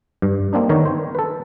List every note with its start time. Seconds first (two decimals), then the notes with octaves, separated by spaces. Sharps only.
0.22 G2
0.53 A#3 C4 D4 D#4
0.69 D#3 B3 A#4 C#5
0.85 C5
1.15 A4 B4